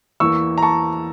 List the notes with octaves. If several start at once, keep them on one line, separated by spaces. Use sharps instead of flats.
E2 E3 A#3 C#6 E6
A#5
A5 C#6